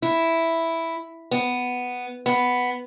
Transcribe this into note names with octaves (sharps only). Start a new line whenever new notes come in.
E4
B3
B3